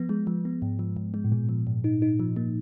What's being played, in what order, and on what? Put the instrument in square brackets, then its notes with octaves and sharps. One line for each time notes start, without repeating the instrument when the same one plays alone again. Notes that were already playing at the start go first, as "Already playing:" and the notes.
Already playing: [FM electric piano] F3 B3
G#3
F3
B3
G#2
F3
G#2
G#3
[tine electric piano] A2
[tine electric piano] A#2 [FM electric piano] G#3
[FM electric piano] F3
G#2
D#4
D#4
F3
A#3